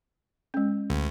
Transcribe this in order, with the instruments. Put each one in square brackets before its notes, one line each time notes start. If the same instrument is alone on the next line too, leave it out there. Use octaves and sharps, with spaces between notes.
[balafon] G#3 C#4
[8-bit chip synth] D2